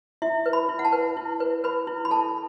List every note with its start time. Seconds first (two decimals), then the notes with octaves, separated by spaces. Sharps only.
0.22 E4 E5
0.46 B4
0.53 B5
0.69 E4
0.79 F#5
0.85 A5
0.92 B4
1.17 E4
1.40 B4
1.64 B4 B5
1.87 E4
2.05 B5
2.11 A4 A5